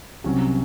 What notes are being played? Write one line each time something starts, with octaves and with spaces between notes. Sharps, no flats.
C2 C3 F#3 C#4